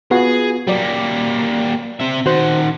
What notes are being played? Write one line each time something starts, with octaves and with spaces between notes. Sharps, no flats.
B3 F4 F#4 G#4
F#3 G3 A#3 D5
C4 E5
D#3 F#4 C5 F#5